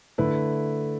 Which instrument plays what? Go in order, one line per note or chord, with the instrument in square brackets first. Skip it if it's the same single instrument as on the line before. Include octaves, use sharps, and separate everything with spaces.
[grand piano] D3 A3 E4 B4